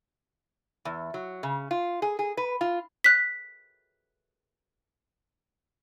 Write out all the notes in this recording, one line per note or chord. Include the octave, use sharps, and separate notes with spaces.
E2
F#3
C#3
F4
G#4
G#4
B4
F4
F#6 B6